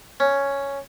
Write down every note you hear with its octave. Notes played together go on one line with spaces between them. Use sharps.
C#4